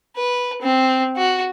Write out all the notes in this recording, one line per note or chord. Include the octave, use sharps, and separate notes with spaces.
B4
C4
F#4